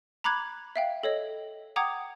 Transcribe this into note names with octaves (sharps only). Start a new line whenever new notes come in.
A#5 B5 D6 F#6 G#6
E5 F5 G5
A4 C#5 D#5
F#5 G5 A#5 D6 D#6 G#6